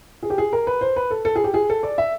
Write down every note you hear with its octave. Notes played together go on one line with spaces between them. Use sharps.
G#4
G4
G#4
A#4
B4
C5
B4
A4
A4
G#4
G4
G#4
A4
D5
E5